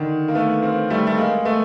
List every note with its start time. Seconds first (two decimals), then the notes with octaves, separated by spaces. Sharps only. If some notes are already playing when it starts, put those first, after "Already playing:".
Already playing: D3 D#3
0.28 A#3
0.35 A3 B3
0.62 A#3 C4
0.90 G3 A3
1.07 A3
1.17 G#3 A#3
1.45 A3 B3